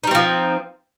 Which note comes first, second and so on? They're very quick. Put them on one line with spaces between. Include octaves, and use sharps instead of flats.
D#4 G3 C4 F3